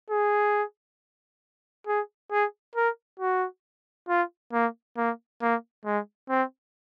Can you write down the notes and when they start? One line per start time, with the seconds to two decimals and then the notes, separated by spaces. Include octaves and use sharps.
0.10 G#4
1.87 G#4
2.31 G#4
2.75 A#4
3.20 F#4
4.09 F4
4.53 A#3
4.97 A#3
5.42 A#3
5.85 G#3
6.29 C4